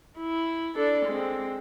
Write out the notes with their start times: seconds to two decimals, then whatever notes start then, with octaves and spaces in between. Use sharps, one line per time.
0.18 E4
0.75 D4 A4
1.06 G#3 C4